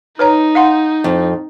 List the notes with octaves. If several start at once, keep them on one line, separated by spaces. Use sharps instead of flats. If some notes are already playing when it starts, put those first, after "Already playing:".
D#4 B4 C#5 A#5
F5 F#5 C6
F2